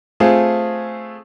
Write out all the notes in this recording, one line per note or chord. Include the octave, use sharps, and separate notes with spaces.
A3 C4 F4 G#4